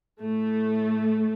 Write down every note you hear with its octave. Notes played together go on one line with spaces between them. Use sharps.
A2 A3